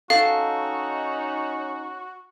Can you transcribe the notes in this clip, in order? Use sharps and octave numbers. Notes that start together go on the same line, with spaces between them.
C#4 D#4 F#4 A4 F5